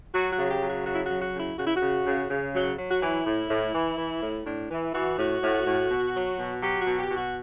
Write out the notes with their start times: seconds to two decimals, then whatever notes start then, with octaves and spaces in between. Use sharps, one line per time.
0.14 F#3 F#4
0.32 F#4
0.38 C#3
0.50 G4
0.62 F#3
0.67 F#4
0.85 C#3 F#4
0.95 E4
1.05 F#4
1.11 F#3
1.22 F#4
1.35 C#3
1.40 E4
1.57 C#3 F#4
1.67 E4
1.76 F#4
1.82 C#3
2.06 C#3
2.30 C#3
2.55 F#3
2.78 F#3
2.90 F#4
3.02 E3 E4
3.26 A2
3.50 A2
3.74 E3
3.98 E3
4.22 A2
4.46 A2 D4
4.71 E3
4.94 E3 F#4
5.18 A2 F#4
5.42 A2
5.66 A2
5.91 B2
6.15 F#3
6.39 B2
6.63 F#3 G4
6.81 F#4
6.87 B2
6.99 G4
7.11 B2
7.17 F#4